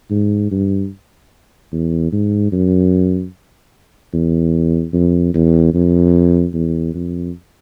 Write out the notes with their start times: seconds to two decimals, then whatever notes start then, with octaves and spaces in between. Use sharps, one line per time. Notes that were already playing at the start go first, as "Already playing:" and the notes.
0.10 G#2
0.51 G2
1.72 E2
2.12 G#2
2.52 F#2
4.13 E2
4.93 F2
5.34 E2
5.74 F2
6.54 E2
6.94 F2